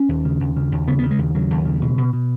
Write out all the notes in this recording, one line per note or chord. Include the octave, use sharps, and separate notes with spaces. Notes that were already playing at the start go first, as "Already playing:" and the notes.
Already playing: C#4
D#2
C#3
D#2
C#3
D#2
C#3 B3
B3
C#3
G#3
D#2
C#3 F#3
D#2
C#3
B2
B2
B2